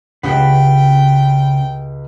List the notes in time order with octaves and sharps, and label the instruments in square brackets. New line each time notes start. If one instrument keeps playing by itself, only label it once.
[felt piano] C#2 G4 F#5 [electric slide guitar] C#3 B4 [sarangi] G5